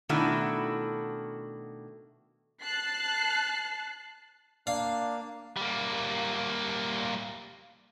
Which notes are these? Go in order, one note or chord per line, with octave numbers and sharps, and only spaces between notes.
B2 D#3 A3 D4 E4 F#4
A5 F#6 C7
A#3 D4 D5 F5
G3 A#3